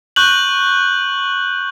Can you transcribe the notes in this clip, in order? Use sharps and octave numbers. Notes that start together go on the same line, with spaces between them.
C#6 F#6 G6 F#7